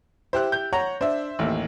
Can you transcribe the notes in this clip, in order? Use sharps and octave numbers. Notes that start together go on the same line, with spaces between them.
E4 G4 C5 F#6
G6
C#5 F#5 A#5
D4 C5 E5
A1 D#2